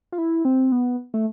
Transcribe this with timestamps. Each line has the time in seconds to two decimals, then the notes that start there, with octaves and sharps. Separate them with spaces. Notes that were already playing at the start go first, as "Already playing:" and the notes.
0.12 F4
0.18 E4
0.45 C4
0.72 B3
1.14 A3